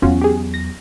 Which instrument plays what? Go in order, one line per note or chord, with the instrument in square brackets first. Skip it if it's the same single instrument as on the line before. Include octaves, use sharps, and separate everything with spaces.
[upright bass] E2 F#3 [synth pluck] C#4 F4 F#4
[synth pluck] G4 G#4
A#6